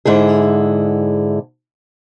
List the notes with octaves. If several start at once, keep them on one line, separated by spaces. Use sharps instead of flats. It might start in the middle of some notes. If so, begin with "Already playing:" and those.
G#2 D3 E4 G#4